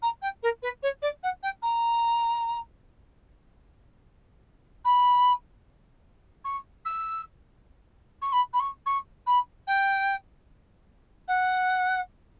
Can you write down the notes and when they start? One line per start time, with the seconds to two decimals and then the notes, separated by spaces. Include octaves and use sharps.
0.02 A#5
0.22 G5
0.43 A#4
0.62 B4
0.83 C#5
1.02 D5
1.23 F#5
1.43 G5
1.62 A#5
4.85 B5
6.45 C#6
6.85 E6
8.22 C#6
8.32 B5
8.53 B5
8.60 C#6
8.86 C#6
9.27 B5
9.67 G5
11.28 F#5